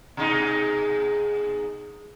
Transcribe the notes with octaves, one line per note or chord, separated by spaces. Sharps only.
B2 G#3 D#4